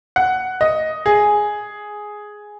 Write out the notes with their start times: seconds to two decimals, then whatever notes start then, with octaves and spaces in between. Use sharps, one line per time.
0.16 F#5
0.61 D#5
1.06 G#4